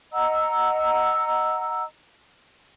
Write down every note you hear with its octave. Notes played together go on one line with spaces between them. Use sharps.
D#5 F#5 A#5 E6